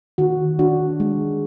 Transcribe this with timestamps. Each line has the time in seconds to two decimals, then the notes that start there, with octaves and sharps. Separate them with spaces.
0.18 D#3 F#4
0.59 D4 F#4
1.00 G#3